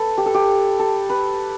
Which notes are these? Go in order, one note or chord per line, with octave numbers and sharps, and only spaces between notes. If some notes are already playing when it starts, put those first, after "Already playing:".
Already playing: A4 B4
G4
A4
G4
A4
B4